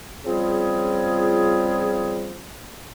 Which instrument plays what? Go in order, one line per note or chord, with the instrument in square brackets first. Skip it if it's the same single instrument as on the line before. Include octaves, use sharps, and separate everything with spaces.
[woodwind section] C#3 F3 G3 C4 F4 G#4